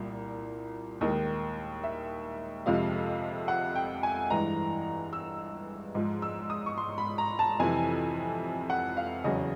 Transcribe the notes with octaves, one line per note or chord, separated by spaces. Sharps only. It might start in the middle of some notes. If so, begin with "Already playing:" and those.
Already playing: C2 A#2 G3
D#2 D#3 G#3 D#5
E5
F2 C3 F3 G#3 F5
F#5
G5
G#5
G2 E3 G#3 A#5
E6
G#2 F3 G#3
E6
D#6
C#6
C6
B5
A#5
A5
F2 C3 E3 G#5
F#5
F5
E2 C#3 F#3 D#5